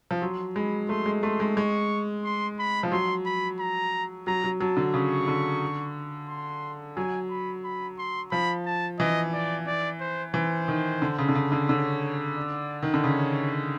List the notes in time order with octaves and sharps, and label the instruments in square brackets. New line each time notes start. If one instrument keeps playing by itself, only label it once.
[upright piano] F3
[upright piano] F#3 [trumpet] C6
[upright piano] G#3 [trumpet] B5
[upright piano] A3 [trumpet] C6
[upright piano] G#3
[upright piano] A3 [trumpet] C6
[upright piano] G#3
[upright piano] G#3 [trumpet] C#6
[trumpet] C6
B5
[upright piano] F3
[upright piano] F#3 [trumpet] C6
[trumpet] B5
A#5
[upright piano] F#3 [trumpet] A#5
[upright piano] F#3
[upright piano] F#3 [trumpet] A5
[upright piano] D3
[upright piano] C#3 [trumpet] C#6
[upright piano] D3
[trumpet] C6
[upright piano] F#3 [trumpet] G#5
[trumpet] B5
B5
C6
[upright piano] F3 [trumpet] B5
[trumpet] A5
[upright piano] E3 [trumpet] D#5
[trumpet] D5
D5
C5
[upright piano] E3 [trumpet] C5
[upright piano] D#3
D3
C#3
D3
C#3
D3
[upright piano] D3 [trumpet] C#5
[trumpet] D5
[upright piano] D#3
D3
[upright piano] C#3 [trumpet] C#5